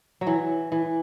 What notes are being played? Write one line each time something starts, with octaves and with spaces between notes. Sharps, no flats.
F#3
E3
E3